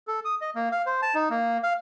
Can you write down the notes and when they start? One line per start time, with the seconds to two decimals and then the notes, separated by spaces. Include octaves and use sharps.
0.08 A4
0.25 D#6
0.41 D#5
0.55 A#3
0.72 F5
0.86 C5
1.02 A5
1.15 D#4
1.30 A#3
1.63 F5